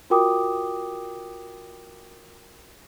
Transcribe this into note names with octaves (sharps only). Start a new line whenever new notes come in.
F4 F#4 A#4 G5 D6 D#6